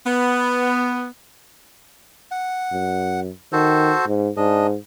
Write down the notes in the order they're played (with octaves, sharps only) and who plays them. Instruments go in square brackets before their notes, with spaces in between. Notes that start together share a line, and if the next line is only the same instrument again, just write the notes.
[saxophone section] B3
[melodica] F#5
[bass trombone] F#2
[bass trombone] D#3 [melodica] F#4 A4 C5
[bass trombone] G#2
[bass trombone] G#2 [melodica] D4 D#5